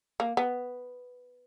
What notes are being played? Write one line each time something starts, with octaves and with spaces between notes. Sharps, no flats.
A#3
B3